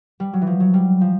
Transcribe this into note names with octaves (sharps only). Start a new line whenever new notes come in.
G3
F#3
E3
F3
F#3
G3
F3